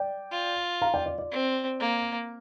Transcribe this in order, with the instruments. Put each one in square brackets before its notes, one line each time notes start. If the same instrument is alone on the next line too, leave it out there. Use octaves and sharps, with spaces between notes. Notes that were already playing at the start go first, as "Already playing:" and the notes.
Already playing: [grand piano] D5 G5
[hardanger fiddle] F4
[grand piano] F5 A#5
D5 G5
D5
D5
[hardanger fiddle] C4
A#3